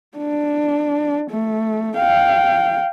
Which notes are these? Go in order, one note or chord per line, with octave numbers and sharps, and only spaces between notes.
D4
A3
F5 G5